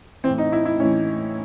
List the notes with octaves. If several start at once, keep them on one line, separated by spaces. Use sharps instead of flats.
A2 E3 C4
D#4
E4
E4
A2 E3 C#4